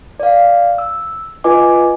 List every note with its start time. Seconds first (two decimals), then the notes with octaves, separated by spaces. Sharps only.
0.20 D5 F5
0.78 E6
1.44 F4 B4 D#5 G#5 D6